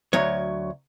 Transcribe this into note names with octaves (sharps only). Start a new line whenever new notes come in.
D2 F#3 C#5